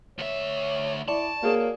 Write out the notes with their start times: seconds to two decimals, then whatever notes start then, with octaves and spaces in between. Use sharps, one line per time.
0.18 D2 C#5 E5
1.08 E4 D5 A5 C#6
1.43 A#3 F#4 G#4 C#5 D5